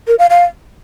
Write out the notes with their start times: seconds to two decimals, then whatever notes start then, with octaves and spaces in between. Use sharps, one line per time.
0.07 A#4
0.19 F5
0.30 F5